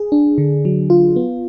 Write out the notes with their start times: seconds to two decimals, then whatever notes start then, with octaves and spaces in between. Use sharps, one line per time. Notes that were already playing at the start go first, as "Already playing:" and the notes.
Already playing: G#4
0.12 D4
0.38 D3
0.65 F#3
0.90 F4
1.16 B3